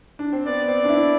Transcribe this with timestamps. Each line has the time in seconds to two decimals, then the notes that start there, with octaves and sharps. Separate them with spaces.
0.19 D4
0.33 C4
0.46 B3 D5
0.68 C4
0.84 D4
0.89 E4